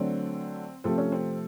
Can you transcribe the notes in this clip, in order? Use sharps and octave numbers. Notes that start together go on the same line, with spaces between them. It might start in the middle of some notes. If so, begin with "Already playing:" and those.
Already playing: D3 F#3 A3 C4
C3 F3 A3 C4
C#4
C4